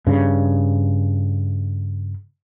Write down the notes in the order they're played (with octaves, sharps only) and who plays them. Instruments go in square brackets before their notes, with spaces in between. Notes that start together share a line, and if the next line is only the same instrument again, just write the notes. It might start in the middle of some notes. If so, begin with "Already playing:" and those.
[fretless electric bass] G2 C#3